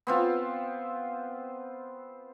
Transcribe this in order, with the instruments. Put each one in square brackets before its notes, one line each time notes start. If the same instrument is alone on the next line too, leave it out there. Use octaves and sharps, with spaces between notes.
[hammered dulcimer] B3 C4 F4